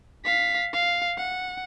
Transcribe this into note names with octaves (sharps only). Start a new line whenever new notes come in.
F5 B6
F5
F#5